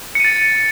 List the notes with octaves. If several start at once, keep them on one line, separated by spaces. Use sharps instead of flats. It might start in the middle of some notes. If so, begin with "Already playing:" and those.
A6 C#7 D#7